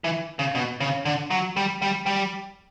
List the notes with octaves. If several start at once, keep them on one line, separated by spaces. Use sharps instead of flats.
E3
C#3
B2
C#3
D3
F#3
G3
G3
G3